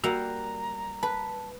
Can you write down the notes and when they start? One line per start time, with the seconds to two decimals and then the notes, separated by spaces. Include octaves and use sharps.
0.04 G3 A#3 F#4 F#5 A#5
1.03 B4 A5